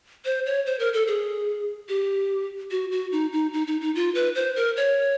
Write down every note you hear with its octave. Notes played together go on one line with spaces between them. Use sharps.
C5
C#5
C5
A#4
A4
G#4
G4
F#4
F#4
D#4
D#4
D#4
D#4
D#4
F4
B4
C5
A#4
C#5